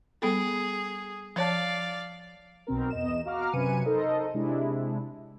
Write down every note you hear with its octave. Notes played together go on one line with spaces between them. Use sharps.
G3 B3 G#4 A4
F3 C#5 D5 F5 A5
B1 B2 C4 A#4
E2 D#5 E7
F#4 F5 A#5 D6 F6
F#2 C3 B4 G#5 C#7 D#7
D#4 A4 A#4 C5 D#5
C3 G#3 D4 E4